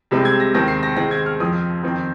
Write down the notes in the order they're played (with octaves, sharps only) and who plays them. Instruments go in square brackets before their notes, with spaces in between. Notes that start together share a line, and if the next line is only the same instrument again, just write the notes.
[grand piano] C2 C3 G#3 C4
G#6
A#6
D#2 D#3 G#3 C4 A#6
C7
A#6
G#2 D#3 G#3 C4 A#6
G#6
F6
F2 F3 C4 D#6
F2 D#3 C4